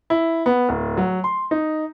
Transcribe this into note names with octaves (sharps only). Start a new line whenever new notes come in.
E4
B3
D1
F#3
C6
D#4